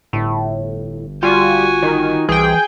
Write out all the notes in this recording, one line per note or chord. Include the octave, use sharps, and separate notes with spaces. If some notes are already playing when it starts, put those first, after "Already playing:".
G1 A2
G3 F4 F#4 G#5
D#3
C2 E3 G#4 G5